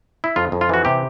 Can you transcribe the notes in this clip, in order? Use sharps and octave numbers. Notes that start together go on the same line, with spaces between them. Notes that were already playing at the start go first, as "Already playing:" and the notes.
E4
F2 F4
F2
F4
E3 F#4
C3 G4